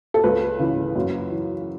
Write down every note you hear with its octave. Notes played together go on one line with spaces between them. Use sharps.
A4
C#2 B4
C#3 E3
F#2
E3